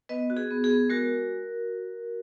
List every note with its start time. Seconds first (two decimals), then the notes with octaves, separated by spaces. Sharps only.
0.09 B3 B4 D#5
0.30 F#4
0.37 G#4
0.51 B3
0.64 G#4
0.70 B3
0.90 G#3 F#4 A#4